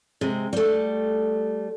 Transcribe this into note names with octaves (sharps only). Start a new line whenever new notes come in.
C3 G#3
G3 A3